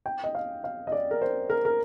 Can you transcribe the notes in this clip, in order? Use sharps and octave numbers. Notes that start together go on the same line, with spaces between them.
G5
D#5
F5
F5
D#5
D5
A#4
C5
A#4
A#4